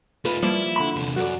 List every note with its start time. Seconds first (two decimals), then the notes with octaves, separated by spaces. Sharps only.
0.25 A3 D#4 F4 B4
0.43 F3 G3 A#3 E4
0.76 D3 B5
0.96 E2 C3
1.16 F#2 F#4 A4 D5